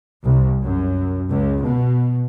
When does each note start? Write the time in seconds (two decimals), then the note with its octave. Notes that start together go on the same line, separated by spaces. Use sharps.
0.24 C2
0.62 F#2
1.30 C#2
1.65 B2